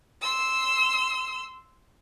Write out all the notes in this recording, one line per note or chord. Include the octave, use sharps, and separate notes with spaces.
C6 E6